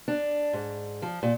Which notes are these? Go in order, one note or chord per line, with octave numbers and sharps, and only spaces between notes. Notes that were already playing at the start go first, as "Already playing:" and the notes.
D4
G#2
F3
A#2